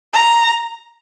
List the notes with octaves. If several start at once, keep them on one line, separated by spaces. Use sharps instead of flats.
A#5